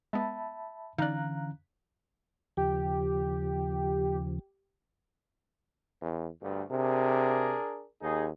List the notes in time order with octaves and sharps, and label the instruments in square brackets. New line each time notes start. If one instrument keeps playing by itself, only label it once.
[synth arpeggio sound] G#3 B3 [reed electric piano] E5 A5 B5
[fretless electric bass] D3 E3 C#4 [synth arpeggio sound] D#4 D5 [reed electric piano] F5 A#5 F#6
[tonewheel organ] D#2 C#3 F3 [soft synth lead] G4
[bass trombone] E2
[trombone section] D2 [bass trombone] G2
[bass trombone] C3 [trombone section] D4 G#4 A#4
[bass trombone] D#2 [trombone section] D#4 G#4